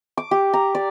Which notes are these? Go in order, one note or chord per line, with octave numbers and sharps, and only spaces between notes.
D6
G4
A#5
D5